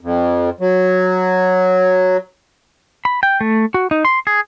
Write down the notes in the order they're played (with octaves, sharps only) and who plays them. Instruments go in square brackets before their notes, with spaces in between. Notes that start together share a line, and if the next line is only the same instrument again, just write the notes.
[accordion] F2
F#3
[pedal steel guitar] B5
G5
A3
F#4
D#4
C6
G#4